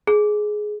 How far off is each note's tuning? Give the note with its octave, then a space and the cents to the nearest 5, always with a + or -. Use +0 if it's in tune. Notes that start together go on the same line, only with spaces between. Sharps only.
G#4 +15